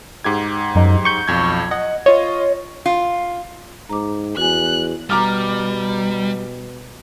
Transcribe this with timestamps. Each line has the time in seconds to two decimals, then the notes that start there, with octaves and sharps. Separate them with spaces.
0.24 G#2 G4 G#6
0.75 F#2 D#4
1.05 C#6 G6
1.28 B1 F2 G#6
1.71 D#5 F#5
2.06 F4 C#5 D#5
2.86 F4
3.90 G#2 A#5 D6
4.37 E2 F#4 G#5 F#6
5.10 B2 G3 A#5 D6 F6